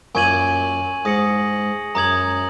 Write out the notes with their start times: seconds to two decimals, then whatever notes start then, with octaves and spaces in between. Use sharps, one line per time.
0.15 F#2 A#2 G#5 C#6 G#6 D#7 F#7
1.05 G#2 D#6 A#6 C#7 F#7
1.95 F#2 A#5 D#6 G#6 F#7